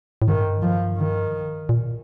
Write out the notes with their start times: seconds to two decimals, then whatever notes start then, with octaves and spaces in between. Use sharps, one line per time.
0.22 A2
0.28 G2 D#3
0.62 F3
0.97 D#3
1.69 A#2